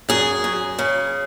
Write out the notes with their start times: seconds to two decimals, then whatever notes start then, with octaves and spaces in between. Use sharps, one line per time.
0.09 F#2 G#4
0.44 F#2
0.79 C#3